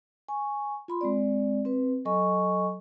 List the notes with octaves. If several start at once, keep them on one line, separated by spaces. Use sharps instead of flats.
G#5 C#6
F4 B5 C6
G#3 C4 D5
C4 B4
F#3 A4 D#5 G#5 C#6